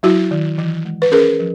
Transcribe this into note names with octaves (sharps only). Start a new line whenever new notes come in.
F#3 E4 F#4
D#3
E3
G#3
B4
C#4 G#4 A#4
F3